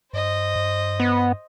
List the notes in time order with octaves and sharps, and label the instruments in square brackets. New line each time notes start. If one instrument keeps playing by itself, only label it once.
[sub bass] G2 [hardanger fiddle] C5 D#5
[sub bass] G2
[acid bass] B3